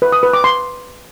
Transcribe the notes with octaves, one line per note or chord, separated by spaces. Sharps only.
B4
D#6
B4
D6
C6